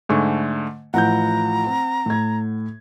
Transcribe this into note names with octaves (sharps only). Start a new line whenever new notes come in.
G#2 D3 A3 G#5 C#6
A1 F3 E4 F#5 A#5 G6
C4
A2 G#6